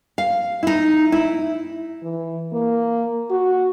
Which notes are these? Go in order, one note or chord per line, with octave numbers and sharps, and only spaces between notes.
F5
D#4 E4
E4
E3
A#3
F#4